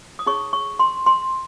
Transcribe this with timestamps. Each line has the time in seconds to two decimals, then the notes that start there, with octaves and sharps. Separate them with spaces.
0.19 D#6
0.26 D#4 G#4 C#5 C#6
0.53 C#6
0.79 C6
1.06 C6